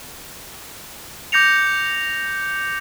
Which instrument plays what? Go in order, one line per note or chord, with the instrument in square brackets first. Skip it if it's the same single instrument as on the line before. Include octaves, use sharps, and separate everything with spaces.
[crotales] D6 G6 A#6 C#7 F7